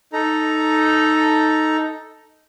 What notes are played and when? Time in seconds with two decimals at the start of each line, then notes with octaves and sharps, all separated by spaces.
0.13 D#4 A4 A#5